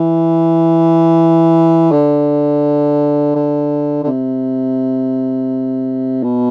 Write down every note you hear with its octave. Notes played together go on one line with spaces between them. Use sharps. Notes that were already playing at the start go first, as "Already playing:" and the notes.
Already playing: E3
D3
D3
D3
C3
B2